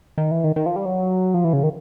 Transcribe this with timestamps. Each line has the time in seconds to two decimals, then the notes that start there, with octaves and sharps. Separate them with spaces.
0.18 D#3
0.31 E3
0.44 D#3
0.56 D#3
0.66 F3
0.76 G3
0.85 F#3
1.34 F3
1.44 E3
1.53 C#3
1.63 D#3